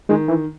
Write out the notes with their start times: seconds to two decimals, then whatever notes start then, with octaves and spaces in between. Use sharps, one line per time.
0.09 D#3 G#3
0.28 E3